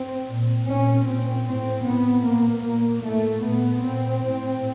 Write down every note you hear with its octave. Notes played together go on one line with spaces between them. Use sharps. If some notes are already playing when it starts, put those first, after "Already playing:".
Already playing: C4
A#2
A#2 C#4
A#2 C4
A2 C4
A2 B3
A#2 A#3
A#2 A#3
A2 A3
A#2 B3
A#2 C4
A2